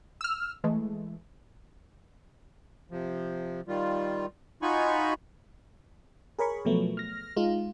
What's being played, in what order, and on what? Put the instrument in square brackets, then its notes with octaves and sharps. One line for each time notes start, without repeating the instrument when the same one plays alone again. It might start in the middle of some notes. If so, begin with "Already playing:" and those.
[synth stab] E6 F6
E3 G#3 A3
[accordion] C3 F3
D#3 G3 F4
D#4 F4 F#4 G#5 B5 C#6
[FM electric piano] G#4 A#4 C#5 B5 C#6
B2 F3 F#3 A3 B3
F6 A#6
G#3 D#4 F4